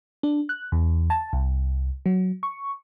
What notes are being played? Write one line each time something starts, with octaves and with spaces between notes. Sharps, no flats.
D4
F#6
E2
A5
C2
F#3
C#6